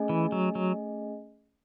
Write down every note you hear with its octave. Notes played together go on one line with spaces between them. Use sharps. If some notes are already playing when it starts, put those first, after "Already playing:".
Already playing: A3 C#4 G#4 D#5 G#5
E3
F#3
F#3